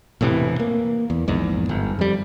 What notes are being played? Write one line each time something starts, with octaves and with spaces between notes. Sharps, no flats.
E1 A2 C3 E3
A#3
E2
A#1 E2 G#2
G1
F2 G3